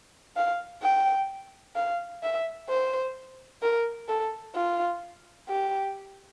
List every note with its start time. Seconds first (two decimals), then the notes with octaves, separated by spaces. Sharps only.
0.36 F5
0.82 G5
1.76 F5
2.23 E5
2.69 C5
3.62 A#4
4.08 A4
4.55 F4
5.48 G4